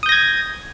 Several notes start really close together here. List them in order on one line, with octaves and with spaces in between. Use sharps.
D#6 G6 A#6 G#6